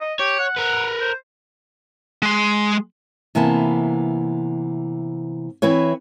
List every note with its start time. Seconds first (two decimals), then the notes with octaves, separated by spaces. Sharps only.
0.01 D#5
0.19 G4 C#5
0.39 F#5
0.57 A#4 B4
1.01 C5
2.22 G#3 C6
3.35 C3 E3 A#3 B3 A5
5.62 E3 C4 E4 B4 C#5